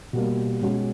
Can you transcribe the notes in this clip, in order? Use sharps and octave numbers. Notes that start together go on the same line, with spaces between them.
B2 G3 A#3
B2 G#3 C#4 F#4